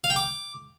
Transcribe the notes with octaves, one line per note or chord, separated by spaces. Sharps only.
F5
G5
D6